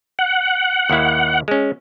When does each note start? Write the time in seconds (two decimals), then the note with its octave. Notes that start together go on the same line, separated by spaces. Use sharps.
0.19 F#5
0.90 D#2 D#3 E4
1.48 G#3 C#4